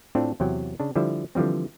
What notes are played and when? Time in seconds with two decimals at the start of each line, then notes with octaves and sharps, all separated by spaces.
0.15 A2 C4 D4 F4 A4
0.40 E2 C3 F#3 G5
0.80 C#3 D4
0.96 D3 F3 G3 E4 E5
1.35 D3 E3 F3 G3 C4